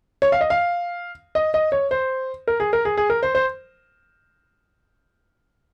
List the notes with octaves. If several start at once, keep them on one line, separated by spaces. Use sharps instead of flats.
C#5
F5
D#5
F5
D#5
D#5
C#5
C5
A#4
G#4
A#4
G#4
G#4
A#4
C5
C5